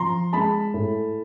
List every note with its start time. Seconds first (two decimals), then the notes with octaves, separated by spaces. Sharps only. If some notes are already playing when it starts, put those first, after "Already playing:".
Already playing: F3 A#5 C6
0.33 G#3 A5 B5
0.74 A2